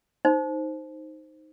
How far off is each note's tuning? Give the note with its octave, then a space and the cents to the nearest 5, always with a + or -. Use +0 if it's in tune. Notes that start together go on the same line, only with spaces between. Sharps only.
D#4 +0 C5 +0